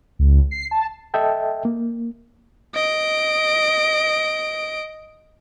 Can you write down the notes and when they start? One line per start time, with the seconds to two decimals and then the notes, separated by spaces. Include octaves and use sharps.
0.19 C#2
0.51 C7
0.71 A5
1.14 A4 D#5 E5 G5 A5
1.65 A#3
2.75 D#5 D7